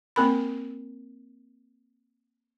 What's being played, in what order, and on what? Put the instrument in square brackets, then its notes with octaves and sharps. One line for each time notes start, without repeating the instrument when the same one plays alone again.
[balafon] A#3 C4 A#4 B5